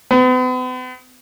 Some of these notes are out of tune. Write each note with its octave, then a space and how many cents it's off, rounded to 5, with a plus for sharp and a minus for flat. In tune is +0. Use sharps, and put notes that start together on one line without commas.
B3 +45